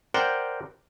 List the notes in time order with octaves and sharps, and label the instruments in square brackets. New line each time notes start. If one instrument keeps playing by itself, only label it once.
[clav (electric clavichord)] A#4 C5 D5 F#5 G5